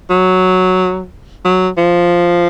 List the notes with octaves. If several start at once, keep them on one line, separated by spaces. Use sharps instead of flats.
F#3
F#3
F3